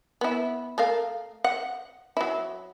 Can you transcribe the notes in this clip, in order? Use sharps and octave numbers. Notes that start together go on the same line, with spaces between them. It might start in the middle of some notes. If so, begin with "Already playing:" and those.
B3 E4
A3 A#4 F5
F#5
F#3 E4